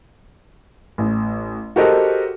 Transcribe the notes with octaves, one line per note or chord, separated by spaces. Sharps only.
A1
F#4 G4 A4 A#4 C5 D#5